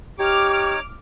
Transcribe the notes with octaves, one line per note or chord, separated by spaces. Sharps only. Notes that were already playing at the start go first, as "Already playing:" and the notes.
D#4 G4 C#5 D6 F6